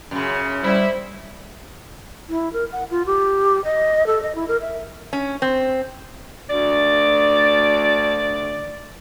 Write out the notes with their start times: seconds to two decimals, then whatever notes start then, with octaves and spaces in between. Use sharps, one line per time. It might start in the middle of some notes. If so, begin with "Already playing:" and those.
0.11 F#2 C#3
0.63 G3 E4 C5 B5
2.29 E4
2.53 A#4
2.72 F#5
2.91 F4
3.06 G4
3.64 D#5
4.07 A4
4.22 D#5
4.35 E4
4.48 A#4
4.61 E5
5.13 C#4
5.42 C4
6.50 D2 D5